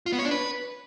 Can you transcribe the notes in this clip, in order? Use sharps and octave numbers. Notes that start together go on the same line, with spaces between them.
F4
B3
C#5
D4
B4